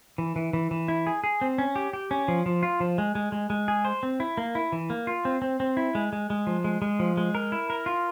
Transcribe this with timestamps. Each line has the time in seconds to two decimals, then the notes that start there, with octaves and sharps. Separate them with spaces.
0.18 E3
0.36 E3
0.53 E3
0.71 E3
0.88 E4
1.07 G#4
1.24 G#4
1.41 C4
1.58 C#4
1.76 G4
1.93 G4
2.11 C#4
2.28 F3
2.46 F3
2.63 F4
2.80 F3
2.98 G#3
3.15 G#3
3.32 G#3
3.50 G#3
3.68 G#4
3.85 C5
4.03 C4
4.20 E4
4.37 A#3
4.55 E4
4.72 E3
4.90 A#3
5.07 F4
5.25 C4
5.42 C4
5.60 C4
5.77 E4
5.95 G#3
6.13 G#3
6.30 G#3
6.47 F3
6.64 G#3
6.82 G#3
6.99 F3
7.17 G#3
7.35 A#4
7.52 E4
7.70 A#4
7.86 F4